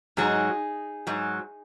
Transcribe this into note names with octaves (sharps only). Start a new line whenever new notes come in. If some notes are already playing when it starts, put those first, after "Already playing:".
G#2 F#3 D#4 G#4
G#2 F#3